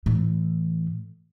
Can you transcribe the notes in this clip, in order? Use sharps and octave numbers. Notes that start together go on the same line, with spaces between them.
A2 E3